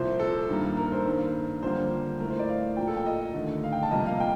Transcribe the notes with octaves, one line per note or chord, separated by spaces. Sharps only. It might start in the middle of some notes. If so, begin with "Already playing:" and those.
Already playing: C2 A#2 F3 C5
A4
G2 D#3 G3 A#3
A#4
C5
G2 D#3 A#3
F2 D3 G3 A#3 C5
A2 A3 A#4
C5
D5
F5
A#2 F3 A#3 G5
A4
G5
D#5
D#2 D3 A3
F5
G5
A5
F2 C3 G3 A#3 D#5
F5
G5